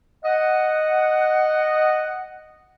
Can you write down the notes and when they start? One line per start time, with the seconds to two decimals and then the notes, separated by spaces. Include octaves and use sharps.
0.24 D#5 F#5